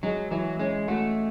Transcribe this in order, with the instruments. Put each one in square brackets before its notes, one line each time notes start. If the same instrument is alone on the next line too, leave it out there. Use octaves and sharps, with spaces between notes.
[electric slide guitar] F#3 [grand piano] G#3
[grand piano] E3 [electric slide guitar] F#3
[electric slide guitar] G#3 [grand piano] C#4
[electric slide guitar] A3 [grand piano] F#4